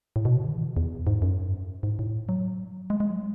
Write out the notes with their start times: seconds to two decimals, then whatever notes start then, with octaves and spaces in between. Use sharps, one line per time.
0.16 A2
0.25 B2
0.36 C#3
0.46 D#3
0.55 E3
0.62 D#3
0.77 E2
1.07 G#2
1.22 F#2
1.83 G#2
1.99 A2
2.29 F#3
2.90 G#3
3.00 G#3
3.10 F#3